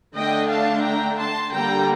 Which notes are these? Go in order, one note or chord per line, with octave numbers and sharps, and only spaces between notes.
D3 A3 D4 D#5 G5
F5 A5
G5 A#5
A5 C6
D3 G3 A#3 G5 A#5